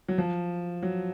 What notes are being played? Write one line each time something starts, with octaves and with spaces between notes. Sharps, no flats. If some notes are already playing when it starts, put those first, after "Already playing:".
F#3
F3
F#3